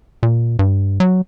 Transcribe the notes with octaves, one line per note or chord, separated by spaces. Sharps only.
A#2
G2
F#3